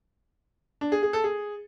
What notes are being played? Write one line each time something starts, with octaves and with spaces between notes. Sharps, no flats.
D4
G#4
G#4
A4
G#4